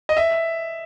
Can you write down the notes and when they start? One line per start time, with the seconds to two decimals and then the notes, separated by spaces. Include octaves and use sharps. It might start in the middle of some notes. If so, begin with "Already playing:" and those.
0.09 D#5
0.17 E5